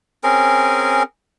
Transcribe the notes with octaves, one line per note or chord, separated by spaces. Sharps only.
C4 C#4 G#4 A#4